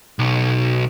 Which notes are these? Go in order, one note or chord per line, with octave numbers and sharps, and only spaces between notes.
B1